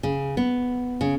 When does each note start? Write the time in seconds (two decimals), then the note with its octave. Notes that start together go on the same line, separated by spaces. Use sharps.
0.03 C#3
0.37 B3
1.01 C#3